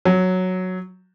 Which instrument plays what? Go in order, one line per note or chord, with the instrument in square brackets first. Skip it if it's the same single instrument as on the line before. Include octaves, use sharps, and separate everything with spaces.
[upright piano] F#3